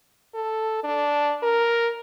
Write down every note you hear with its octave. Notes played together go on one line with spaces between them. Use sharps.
A4
D4
A#4